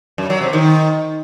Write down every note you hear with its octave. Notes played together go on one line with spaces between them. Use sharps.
F#2
F#3
C3
D#3